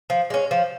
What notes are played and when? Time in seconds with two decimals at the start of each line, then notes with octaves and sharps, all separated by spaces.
0.10 F3
0.30 G#3 C#4
0.51 F3